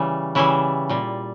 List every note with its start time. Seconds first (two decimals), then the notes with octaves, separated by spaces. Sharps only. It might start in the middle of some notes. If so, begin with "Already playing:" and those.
Already playing: C#3 E3 G3
0.35 C#3 E3 G3 E4
0.89 A#2 G3